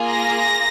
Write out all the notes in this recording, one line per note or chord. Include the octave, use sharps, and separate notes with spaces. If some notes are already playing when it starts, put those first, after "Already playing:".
Already playing: A#3 F4 G#4
A#6